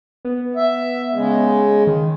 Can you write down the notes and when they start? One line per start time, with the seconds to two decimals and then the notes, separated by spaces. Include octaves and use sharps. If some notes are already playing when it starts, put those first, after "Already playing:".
0.25 B3
0.56 E5
1.13 C#3 G#3
1.87 D#3